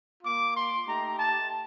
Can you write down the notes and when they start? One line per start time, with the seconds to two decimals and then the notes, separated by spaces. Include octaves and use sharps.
0.23 A#3 F4 D6
0.55 C6
0.87 A3 D#4 G4 A#5
1.19 A5